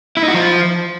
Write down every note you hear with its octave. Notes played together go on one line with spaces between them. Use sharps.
E4
D#4
F#4
F3